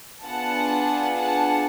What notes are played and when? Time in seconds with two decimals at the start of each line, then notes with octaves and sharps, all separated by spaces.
0.24 B3 D4 F4 G#4 F#5 A5
1.16 F#5 A5